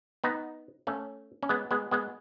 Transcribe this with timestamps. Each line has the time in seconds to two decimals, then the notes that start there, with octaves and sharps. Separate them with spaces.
0.24 B3 D#4
0.87 A3 C#4
1.43 C#4
1.49 G#3 B3
1.71 G#3 B3
1.91 G#3 B3